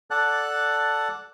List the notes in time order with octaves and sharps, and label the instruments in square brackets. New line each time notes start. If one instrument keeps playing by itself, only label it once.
[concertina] A4 D5 F#5 A5 F#6